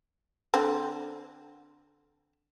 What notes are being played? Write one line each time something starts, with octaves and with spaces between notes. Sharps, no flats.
D3 C4